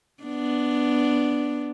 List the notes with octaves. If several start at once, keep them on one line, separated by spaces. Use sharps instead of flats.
B3 D4